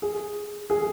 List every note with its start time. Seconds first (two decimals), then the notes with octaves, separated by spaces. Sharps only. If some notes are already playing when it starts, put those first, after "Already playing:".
0.02 G#4
0.70 G#4